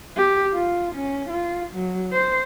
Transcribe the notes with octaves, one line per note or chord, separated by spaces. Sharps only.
G4
F4
C#4
F4
F#3
C5